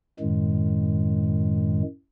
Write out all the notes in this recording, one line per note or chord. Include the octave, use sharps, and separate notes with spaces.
F#2 A2 D#3 G#3